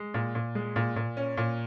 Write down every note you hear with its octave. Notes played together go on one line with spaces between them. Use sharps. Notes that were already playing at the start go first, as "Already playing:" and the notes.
Already playing: G#3
A#2
A#2
G#3
A#2
A#2
C#4
A#2